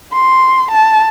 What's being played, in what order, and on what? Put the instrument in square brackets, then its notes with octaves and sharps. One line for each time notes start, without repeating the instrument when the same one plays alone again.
[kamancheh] C6
A5